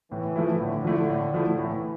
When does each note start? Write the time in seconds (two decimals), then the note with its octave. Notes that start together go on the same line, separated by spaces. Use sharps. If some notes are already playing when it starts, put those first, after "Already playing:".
0.11 A2 E3
0.36 F3 A3 E4
0.60 A2 D3
0.85 F3 A3 E4
1.10 A2
1.34 F3 A3 E4
1.58 A2 E3